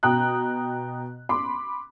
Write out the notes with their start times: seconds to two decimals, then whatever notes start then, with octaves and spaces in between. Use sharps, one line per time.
0.03 B2 G5 A#5 D#6 F#6
1.29 B5 C6 D6